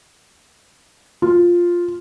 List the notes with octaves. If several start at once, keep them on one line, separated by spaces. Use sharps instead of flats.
F4